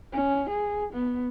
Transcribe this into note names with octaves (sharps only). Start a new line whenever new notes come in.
C#4
G#4
B3